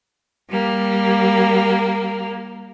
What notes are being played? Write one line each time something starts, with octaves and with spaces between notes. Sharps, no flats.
G3 A#3